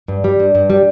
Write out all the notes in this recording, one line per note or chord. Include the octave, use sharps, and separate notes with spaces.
G2
G3
G2
G2
G3